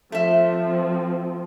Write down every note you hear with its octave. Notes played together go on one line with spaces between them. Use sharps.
F3 A3 C4 E5